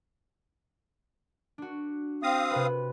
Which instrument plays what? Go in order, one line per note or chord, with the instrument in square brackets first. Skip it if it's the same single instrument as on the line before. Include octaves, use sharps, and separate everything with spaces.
[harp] D4 F#4
[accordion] C4 F5 D#6 [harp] A#6
[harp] C3 B4